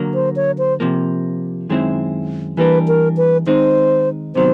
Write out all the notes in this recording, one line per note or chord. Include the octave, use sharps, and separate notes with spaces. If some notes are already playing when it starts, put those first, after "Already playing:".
Already playing: D3 F#3 A#3
C5
C#5
C5
C3 F3 A#3
F#2 D#3 G#3 C4 E4
E3 G3 A#3 D4 B4
A#4
B4
D#3 G#3 C4 D#4 C5
C3 D#3 F#3 B3 C5